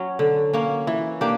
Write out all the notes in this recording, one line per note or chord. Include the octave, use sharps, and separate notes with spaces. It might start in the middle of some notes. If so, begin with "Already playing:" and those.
Already playing: F#3 C#4
D3
A#3 C#4
E3
A#3 D4 G4